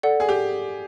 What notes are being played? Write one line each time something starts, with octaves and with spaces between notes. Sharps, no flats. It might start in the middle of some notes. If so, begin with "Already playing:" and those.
A4 D5 F#5
G#4
G4